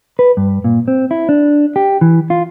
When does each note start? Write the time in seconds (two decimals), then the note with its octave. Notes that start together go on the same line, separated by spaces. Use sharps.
0.19 B4
0.37 G2
0.64 A#2
0.88 C4
1.11 E4
1.29 D4
1.76 G4
2.01 E3
2.30 F4